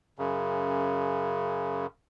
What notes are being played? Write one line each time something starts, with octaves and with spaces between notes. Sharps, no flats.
F#2 C#3